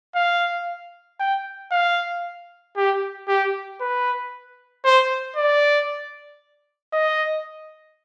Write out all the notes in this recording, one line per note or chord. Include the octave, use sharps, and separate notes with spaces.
F5
G5
F5
G4
G4
B4
C5
D5
D#5